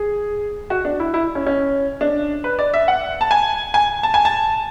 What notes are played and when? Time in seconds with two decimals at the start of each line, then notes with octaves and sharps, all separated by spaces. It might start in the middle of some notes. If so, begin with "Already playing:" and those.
Already playing: G#4
0.70 F#4
0.85 D4
1.00 E4
1.14 E4
1.35 C#4
1.46 C#4
2.01 D4
2.44 B4
2.59 D5
2.74 E5
2.88 F#5
3.21 A5
3.31 G#5
3.74 G#5
4.03 A5
4.14 G#5
4.25 A5